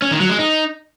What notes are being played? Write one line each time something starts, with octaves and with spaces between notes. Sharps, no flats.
C#4
D#3
F#3
G#3
D#4